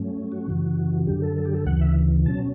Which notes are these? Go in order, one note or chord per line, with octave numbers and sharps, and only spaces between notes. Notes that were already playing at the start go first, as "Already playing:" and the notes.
Already playing: G2 F#3 A3 C#4
F#4
F#2 C#3 E3
F#2 D3 F#3 G4
A4
A4
G4
A4
D2 C#3 E3 F#5
E5
B2 F#3 C#4 A5